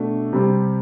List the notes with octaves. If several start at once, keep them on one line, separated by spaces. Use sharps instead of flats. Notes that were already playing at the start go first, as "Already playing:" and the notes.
Already playing: B2 A3 D4
C3 G3 C4